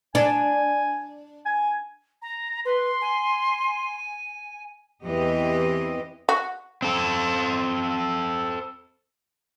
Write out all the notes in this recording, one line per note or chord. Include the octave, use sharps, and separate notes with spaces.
D4 G#5
G#5
A#5
B4 C6
G#5
E2 E3 C4 G4 D#5
F#4
C4 A4